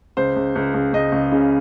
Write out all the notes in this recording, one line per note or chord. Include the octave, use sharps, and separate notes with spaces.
C#2 C5
C#2
C#2
C#2
C#2 D#5
C#2
C#3